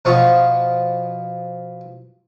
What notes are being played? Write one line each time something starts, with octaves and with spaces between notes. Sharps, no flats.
B2 F3 F4 F5 C#6 D#6